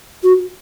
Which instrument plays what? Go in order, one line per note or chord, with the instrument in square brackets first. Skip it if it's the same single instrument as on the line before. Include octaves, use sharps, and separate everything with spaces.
[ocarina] F#4